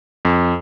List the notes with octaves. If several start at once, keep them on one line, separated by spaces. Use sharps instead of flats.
F2